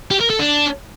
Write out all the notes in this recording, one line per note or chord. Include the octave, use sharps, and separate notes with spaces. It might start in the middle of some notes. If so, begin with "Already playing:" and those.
G4
A#4
A4
D4